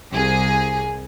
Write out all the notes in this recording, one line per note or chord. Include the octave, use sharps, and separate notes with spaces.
C2 G#4